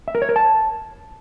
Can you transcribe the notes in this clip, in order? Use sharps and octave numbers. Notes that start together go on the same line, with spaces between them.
E5
A#4
C#5
A#4
A5